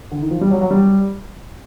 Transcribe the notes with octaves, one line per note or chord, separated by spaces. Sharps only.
D3
D#3
F3
G3
F#3
F#3
G3